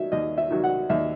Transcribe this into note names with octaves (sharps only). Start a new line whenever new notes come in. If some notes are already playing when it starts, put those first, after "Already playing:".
Already playing: D#3 F#3 E5
D#2 D#5
E5
D#3 F#3
F#5
D#2 E5